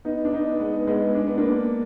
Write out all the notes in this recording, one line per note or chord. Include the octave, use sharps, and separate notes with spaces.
B3 D#4
D4
B3 D#4
G#3 B3
G#3 B3
D4
B3
A#3 D4